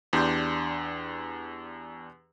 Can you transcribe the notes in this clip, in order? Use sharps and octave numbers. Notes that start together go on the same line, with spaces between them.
E2 D4 G4 C6 G6